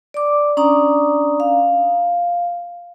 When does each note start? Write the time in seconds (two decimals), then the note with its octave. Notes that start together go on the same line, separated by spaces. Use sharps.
0.14 D5 D6
0.57 C#4 D4 D5 A#5 D#6
1.40 F5